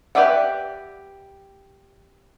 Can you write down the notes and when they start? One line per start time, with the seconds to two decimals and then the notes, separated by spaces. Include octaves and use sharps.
0.15 G4 B4 D5 E5 F#5